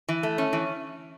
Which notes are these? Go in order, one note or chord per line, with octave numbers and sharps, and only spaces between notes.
E3
A3
C#4
E3